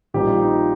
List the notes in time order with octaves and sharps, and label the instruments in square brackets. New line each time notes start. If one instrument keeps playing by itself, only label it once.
[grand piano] A#1 A#2 G3 C4 D#4 G4
F4
D#4
F4